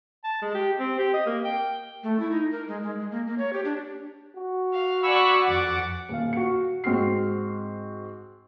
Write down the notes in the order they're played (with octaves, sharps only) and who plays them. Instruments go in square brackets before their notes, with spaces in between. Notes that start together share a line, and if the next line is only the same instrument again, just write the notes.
[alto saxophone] A5
G#3
G4
C4
G4
D#5
A#3
G5
[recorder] A3
E4
D#4
A#4
G#3
G#3
G#3
A#3
A#3
C#5
G4
D4
[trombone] F#4
[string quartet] F5
[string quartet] D5 F#5 G#5 [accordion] B5 C#6 E6
[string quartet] F2 D6 A6 [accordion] F#5
[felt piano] D#1 F5
F#4 C#7
G#2 C4 F#4 F6 C7